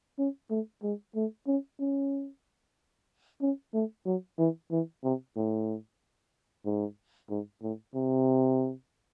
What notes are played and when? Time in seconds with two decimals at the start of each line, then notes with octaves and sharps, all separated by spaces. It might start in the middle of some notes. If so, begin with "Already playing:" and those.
0.19 C#4
0.50 A3
0.83 G#3
1.16 A3
1.47 C#4
1.80 C#4
3.41 C#4
3.74 A3
4.06 F#3
4.38 E3
4.71 E3
5.04 C3
5.36 A2
6.65 G#2
7.30 G#2
7.62 A2
7.95 C3